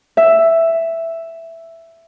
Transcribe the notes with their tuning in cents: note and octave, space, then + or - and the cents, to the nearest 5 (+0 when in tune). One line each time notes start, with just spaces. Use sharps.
E5 +5